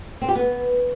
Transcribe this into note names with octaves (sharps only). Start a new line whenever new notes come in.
C4
G4
B3